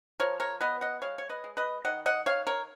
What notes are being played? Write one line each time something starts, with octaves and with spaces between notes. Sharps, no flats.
F3 A#4 C#5
A#4 C#5
B3 B4 D#5
D#5 F#5
G#3 C#5 F5
C#5
B4 D#5
G#3
B4 D#5
D#3 D#5 F#5
D#5 F#5
D#3 C#5 F5
A#4 C#5